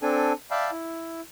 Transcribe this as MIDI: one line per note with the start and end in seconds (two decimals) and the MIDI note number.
0.02 0.33 60
0.02 0.33 62
0.02 0.33 69
0.02 0.33 80
0.51 0.71 74
0.51 0.71 76
0.51 0.71 77
0.51 0.71 79
0.51 0.71 81
0.51 0.71 83
0.72 1.21 64